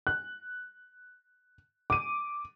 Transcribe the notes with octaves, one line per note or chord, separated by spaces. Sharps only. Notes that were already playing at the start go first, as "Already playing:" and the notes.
F#6
D6 D#7